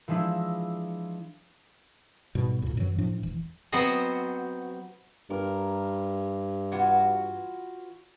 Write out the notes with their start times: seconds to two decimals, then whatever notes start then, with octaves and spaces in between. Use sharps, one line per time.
0.08 E3 F3 G#3 D4 E4
2.35 G#2 B2 G3
2.62 D2 A#2
2.77 F#2 E3 F#3
2.98 A2 F3 D4
3.23 E1 E3
3.72 F#3 B3 C4 C5 D#5
5.30 G2 A#4
6.72 E3 F4 F#4